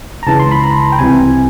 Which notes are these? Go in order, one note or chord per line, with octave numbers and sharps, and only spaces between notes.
A#5
C#2 C#3 E3 A5
C6
B5
A#5
G5
C2 C3 E3 G#5